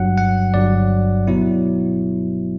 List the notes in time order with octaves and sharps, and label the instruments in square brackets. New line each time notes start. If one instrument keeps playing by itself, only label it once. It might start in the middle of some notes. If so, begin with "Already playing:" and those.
Already playing: [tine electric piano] G1 G2 F#3 F#5
F#5
G1 G2 F#3 D5
B2 F#3 B3 E4